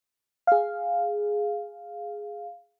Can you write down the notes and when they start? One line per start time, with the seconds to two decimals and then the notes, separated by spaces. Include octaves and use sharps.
0.47 G#4 F5